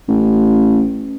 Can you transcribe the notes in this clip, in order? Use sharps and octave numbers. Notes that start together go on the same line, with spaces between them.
A1